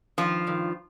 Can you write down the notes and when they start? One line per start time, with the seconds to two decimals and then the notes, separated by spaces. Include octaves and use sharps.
0.18 G2 D#3 F3 F4
0.47 G2 D#3